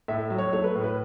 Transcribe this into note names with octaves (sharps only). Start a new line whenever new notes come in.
A2 E5
F#3
C#5
A3 C#5
B4
A2
B4